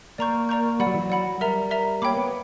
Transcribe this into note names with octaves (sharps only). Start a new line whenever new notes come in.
A#3 D5 A#5 C#6 G6
D5 A#5 C#6 G6
G3 D5 F#5 B5
F#3
E3
F#3
D5 F#5 B5
G3 A#4 E5 A#5
A#4 E5 A#5
A#3 C#5 G5 B5 D6
B3